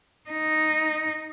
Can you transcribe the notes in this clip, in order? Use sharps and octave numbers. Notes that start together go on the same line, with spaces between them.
D#4